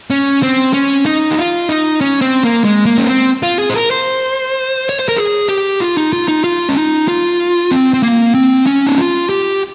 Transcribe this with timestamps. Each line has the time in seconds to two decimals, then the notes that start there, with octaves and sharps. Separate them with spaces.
0.10 C#4
0.43 C4
0.73 C#4
1.06 D#4
1.31 G4
1.37 F4
1.69 D#4
2.01 C#4
2.21 C4
2.43 A#3
2.64 G#3
2.86 A#3
2.98 C#4
3.07 C4
3.43 F4
3.59 G#4
3.70 C5
3.75 A#4
3.91 C5
4.89 C#5
4.99 C5
5.09 A#4
5.17 G#4
5.49 G4
5.81 F4
5.97 D#4
6.13 F4
6.28 D#4
6.44 F4
6.69 C#4
6.76 D#4
7.08 F4
7.71 C4
7.94 C4
8.03 A#3
8.34 C4
8.67 C#4
8.87 D#4
8.98 F4
9.30 G4